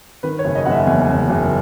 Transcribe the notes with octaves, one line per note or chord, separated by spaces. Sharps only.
D#3 B4
C#5
F#1
D#5
F#1 F#5
E5
E2 G#5
E2
F#1